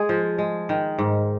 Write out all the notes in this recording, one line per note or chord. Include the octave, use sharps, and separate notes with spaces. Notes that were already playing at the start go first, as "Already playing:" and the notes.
Already playing: G#3 G#4
F3
G#3
D#3
G#2